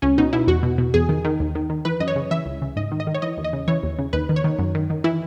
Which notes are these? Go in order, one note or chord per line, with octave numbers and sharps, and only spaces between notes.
C#2 C#4
B2 D#4
B2 E4
E2 F#4
B2
B2
E2 G#4
D#3
D#3
D#2
D#3
D#3
E3 B4
F#2 D#5
C#5
C#3
E3 E5
C#2
C#3
G#2 D#5
D#3
D#5
D#3
C#5
E3 D#5
D#2
D#5
C#3
E3 C#5
D#2
C#3
D#2 B4
D#3
C#5
D#3
F#2
D#3
D#3
E3 E4